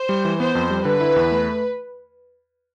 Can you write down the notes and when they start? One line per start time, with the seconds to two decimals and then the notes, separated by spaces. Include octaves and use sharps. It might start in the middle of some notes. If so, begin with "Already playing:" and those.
Already playing: C5
0.09 G3
0.25 E3
0.40 B3 C5
0.55 F2
0.70 G3
0.85 D3 B4
1.01 E4
1.16 E2
1.31 A3